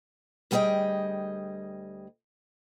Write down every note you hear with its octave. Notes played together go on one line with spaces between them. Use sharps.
D2 G3 G#4 A4 D#5 G5